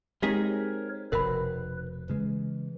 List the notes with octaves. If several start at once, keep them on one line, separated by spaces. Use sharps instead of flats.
G#3 C4 D#4 G4 G#4 A#4 C#5 B6
F1 B2 A#4 B4 B5
C#3 E3 G#3